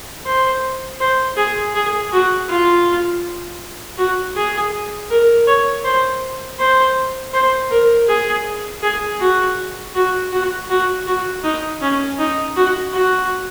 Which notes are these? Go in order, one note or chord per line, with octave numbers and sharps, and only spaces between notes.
C5
C5
G#4
G#4
F#4
F4
F#4
G#4
A#4
C#5
C5
C5
C5
A#4
G#4
G#4
F#4
F#4
F#4
F#4
F#4
D#4
C#4
D#4
F#4
F#4